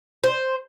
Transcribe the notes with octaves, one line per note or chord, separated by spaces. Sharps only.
C5